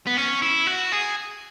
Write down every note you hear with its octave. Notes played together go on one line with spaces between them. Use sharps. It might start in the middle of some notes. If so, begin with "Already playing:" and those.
B3
C#4
E4
F#4
G#4